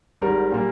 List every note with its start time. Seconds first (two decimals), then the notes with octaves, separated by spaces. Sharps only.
0.22 G#1 G#2 G3 A#4
0.52 A#2 G3 A#3